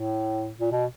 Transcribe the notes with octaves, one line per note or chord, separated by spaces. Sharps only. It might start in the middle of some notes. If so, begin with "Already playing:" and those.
Already playing: A2
A#2
B2